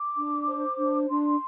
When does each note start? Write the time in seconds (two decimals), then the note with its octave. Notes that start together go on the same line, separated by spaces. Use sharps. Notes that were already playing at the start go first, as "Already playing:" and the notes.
Already playing: D6
0.17 D4
0.48 C5
0.78 D4
1.09 D4 C6